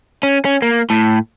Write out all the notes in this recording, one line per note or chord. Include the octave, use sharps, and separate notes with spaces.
C#4
C#4
A#3
A2